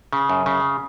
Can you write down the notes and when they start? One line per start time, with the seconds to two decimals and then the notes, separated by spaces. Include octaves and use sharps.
0.13 C#3
0.29 F#2
0.46 C#3